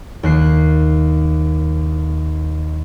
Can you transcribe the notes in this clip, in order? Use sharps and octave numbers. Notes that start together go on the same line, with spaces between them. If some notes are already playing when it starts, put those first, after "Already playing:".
D#2 F#6 C7